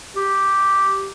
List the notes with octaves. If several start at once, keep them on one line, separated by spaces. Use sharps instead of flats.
G4